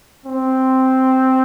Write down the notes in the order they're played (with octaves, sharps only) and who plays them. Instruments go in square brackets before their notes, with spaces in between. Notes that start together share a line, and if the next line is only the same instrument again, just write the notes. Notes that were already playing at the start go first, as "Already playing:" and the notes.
[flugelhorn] C4